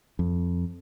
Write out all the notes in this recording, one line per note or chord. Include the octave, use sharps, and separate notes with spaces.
F2